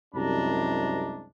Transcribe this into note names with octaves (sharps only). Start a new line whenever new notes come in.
C2 F#2 C3 G#3 D4 A#5